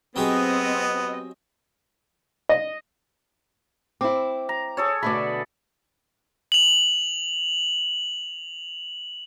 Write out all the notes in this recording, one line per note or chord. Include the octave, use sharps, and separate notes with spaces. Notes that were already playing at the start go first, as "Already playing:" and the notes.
F#3 B3 C4 G4 G#4 D#5
D#5
C4 E4 D6
A#5
G#4 A4 C#5
B2 D3 A3 D5 B5
F7 F#7